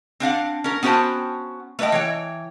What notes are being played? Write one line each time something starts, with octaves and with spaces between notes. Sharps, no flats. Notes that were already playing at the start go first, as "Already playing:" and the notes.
C4 D4 F5 F#5
C#4 A#4
B3 C#4 F#4 C5 G5 A5
A3 B4 C#5 D#5 G5
E3 C#5 G5